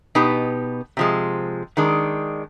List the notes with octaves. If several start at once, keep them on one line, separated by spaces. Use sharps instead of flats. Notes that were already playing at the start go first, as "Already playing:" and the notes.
B2 B3 D#4 G4
C3 F3 G#3
D#3 G#3 D4